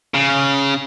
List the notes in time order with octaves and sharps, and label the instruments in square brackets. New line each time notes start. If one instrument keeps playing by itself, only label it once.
[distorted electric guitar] C#3